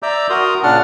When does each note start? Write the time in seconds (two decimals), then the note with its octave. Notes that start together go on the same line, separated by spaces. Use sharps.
0.03 D5 E5 A#5 D6 E6 G6
0.30 F#4 A#4 A#5 C6 D#6
0.63 A#2 C#3 D4 F#5 A5 F6